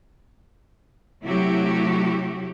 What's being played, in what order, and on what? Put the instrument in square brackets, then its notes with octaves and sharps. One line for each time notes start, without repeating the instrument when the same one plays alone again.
[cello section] C3 F#3 A3 E4 F#4 G4